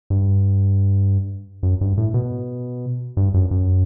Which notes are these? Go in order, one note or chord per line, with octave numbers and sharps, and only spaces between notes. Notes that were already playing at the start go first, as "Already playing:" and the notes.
G2
F#2
G2
A2
B2
G2
F#2
F#2